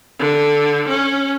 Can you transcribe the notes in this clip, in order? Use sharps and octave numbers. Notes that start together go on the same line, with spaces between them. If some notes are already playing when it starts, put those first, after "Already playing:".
D3
C#4